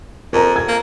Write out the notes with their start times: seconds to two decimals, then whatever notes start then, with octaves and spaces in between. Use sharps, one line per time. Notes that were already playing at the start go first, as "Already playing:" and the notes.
0.33 F2 A#4 A#5
0.56 G#6
0.68 A#3